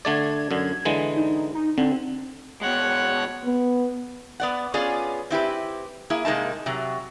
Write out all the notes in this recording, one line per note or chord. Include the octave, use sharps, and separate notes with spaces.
D3 A3 D5 G#6
F#2 D3
D3 E3 G#3
D#4
D#4
D3 C4
B2 G#3 C#5 F#5
B3
B3 D5 F#5
B3 C#4 F4 G#4 D5
C4 E4 G4 B4
A#3 E4 G#4
C3 G#3 A#3 D#4 A5
C3 F#3